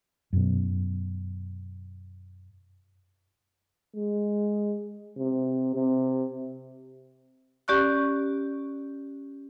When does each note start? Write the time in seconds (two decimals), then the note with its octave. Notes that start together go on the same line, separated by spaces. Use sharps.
0.33 F#2 B2
3.96 G#3
5.18 C3
5.75 C3
7.68 C#4 G4 D5 C#6 F#6